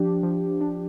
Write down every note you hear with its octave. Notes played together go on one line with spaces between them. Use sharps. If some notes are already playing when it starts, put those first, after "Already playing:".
Already playing: F3 D4 G4
F3
D4